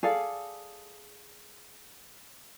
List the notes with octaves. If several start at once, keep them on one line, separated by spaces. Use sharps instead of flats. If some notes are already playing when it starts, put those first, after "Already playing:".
G#4 A4 D5 F5